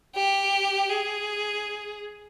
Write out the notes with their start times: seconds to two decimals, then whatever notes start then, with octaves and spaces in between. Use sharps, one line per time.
0.15 G4
0.90 G#4